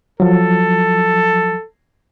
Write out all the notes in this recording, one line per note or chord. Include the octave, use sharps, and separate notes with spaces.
F3 F#3 A4